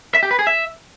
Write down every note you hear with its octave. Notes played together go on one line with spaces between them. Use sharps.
E5
G4
B4
G#4
E5